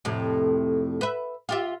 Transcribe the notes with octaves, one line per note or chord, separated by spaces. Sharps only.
F2 A2 C3
B4 E5
F4 G4 E5